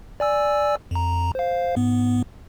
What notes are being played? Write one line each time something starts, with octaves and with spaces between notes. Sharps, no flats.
D5 G#5 E6
F2 A#5
C5 F5
G#2 B3